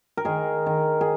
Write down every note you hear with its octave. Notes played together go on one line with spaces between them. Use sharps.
A#4
D#3 G#4
D#3
G#4